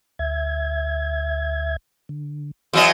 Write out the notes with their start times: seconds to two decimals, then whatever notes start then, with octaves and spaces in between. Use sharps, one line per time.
0.19 D2 E5 G#6
2.09 D3
2.73 E2 F#3 F#4 D#5